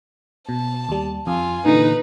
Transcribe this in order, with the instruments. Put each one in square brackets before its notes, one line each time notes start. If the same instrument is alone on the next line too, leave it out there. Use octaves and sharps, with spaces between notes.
[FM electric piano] B2 [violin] A5
[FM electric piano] D#2 G3
[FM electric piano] F2 [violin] F4 G#5
[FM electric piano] A#2 D3 E3 [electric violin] D#4 [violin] B4